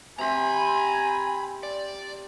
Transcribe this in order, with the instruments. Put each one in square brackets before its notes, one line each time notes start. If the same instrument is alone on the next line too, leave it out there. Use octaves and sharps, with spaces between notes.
[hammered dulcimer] C3 C4 [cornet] G#5 [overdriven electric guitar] A#5 B5
[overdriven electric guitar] D5